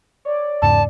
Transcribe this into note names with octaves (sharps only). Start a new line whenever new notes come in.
C#5 D5
E2 G#2 C#3 A5